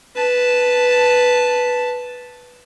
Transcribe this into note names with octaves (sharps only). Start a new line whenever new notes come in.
B4 A5